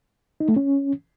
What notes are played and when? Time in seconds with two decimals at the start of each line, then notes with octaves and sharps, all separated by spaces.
0.40 D#4
0.48 A3
0.56 C#4